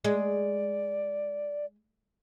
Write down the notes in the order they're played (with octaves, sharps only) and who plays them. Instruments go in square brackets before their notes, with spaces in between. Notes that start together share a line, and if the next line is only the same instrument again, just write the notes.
[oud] G#3 [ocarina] D5